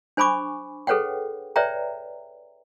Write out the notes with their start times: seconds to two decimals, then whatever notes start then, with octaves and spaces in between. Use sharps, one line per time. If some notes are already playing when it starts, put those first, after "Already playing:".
0.17 D4 C5 G#5 B5 C#6 D6
0.87 G#4 A4 B4 C#5 F#5 G5
1.56 B4 C#5 D5 E5 G5 A#5